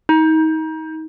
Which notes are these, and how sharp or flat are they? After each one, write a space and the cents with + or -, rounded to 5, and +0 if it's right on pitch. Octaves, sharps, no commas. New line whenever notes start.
D#4 +30